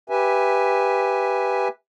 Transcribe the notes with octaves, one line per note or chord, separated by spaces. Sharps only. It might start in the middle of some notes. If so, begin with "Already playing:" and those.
G4 B4 E5 G#5